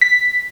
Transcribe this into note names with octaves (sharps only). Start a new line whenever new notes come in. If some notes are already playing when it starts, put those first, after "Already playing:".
B6